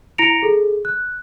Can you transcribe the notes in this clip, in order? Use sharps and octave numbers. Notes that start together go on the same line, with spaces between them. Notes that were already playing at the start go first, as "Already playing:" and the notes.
E4 A#5 A#6 C#7 D7 F7
G#4 A4
F#6